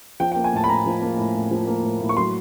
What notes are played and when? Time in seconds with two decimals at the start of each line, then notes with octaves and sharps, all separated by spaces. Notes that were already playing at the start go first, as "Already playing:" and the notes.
0.20 F3 G5
0.32 G5
0.36 A#3
0.44 G#5
0.53 A2 A5
0.64 B5
0.69 A2 A#5
0.86 F3
1.02 A#3
1.18 A2
1.35 A2
1.51 F3
1.67 A#3
1.83 A2
2.01 A2
2.09 C#6
2.17 F#3 C6